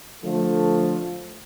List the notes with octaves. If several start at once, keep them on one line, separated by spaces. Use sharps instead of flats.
D3 F3 A3